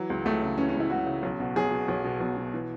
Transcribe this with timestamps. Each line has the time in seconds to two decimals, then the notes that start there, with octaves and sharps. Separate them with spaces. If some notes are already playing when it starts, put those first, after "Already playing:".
Already playing: E3 F#3
0.10 C#2
0.25 C#2 A3
0.42 C#3
0.58 E3 C#4
0.69 C#4
0.74 C#2
0.80 E4
0.90 C#2 F#4
1.06 C#3
1.23 B1
1.40 B2
1.56 B1 G#4
1.72 B2
1.88 B1
2.04 B2
2.20 B1
2.37 B2
2.54 E3